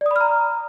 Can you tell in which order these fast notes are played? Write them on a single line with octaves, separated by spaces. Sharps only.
D5 D#6 B5 F6 A#5